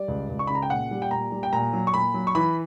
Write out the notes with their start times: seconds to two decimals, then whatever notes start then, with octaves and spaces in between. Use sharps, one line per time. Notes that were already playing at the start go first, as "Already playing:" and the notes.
Already playing: G3 D5
0.08 C#2
0.29 C#2
0.39 C#6
0.47 C#3 B5
0.55 A#5
0.62 G5
0.70 A#2 F#5
0.91 G3
1.02 G5
1.11 A#2 A#5
1.32 G3
1.43 G5
1.53 A#2 A#5
1.73 F#3
1.87 C#6
1.94 A#2 B5
2.14 F#3
2.27 C#6
2.35 E3 B5